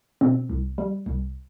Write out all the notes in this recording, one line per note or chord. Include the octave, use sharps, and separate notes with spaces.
B2 C4
C2
G3
C2